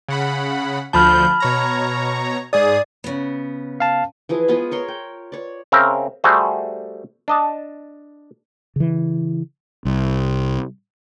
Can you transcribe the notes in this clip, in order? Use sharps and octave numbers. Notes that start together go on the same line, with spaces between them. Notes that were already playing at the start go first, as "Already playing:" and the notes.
C#3 F#5 B5
D2 F3 A5 B5 F6 G6
B2 C#5 A#5
G#2 G#4 D5 D#6
C#3 B3
F5 A5
E3 F3 G#4
G#3 B3 F4 G#4
A#4 C#5 C6
G5
C#5 D5
C#3 C4 A#4 E5
G3 A3 F#4 G#4 C5
D4 D#5 A5
C#3 E3
C2